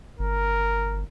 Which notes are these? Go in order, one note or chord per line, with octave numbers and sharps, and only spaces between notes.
G1 A#4